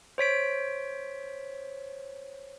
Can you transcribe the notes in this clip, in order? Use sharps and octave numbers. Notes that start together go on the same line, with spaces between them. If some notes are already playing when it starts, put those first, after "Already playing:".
C5 C#5 B6 D7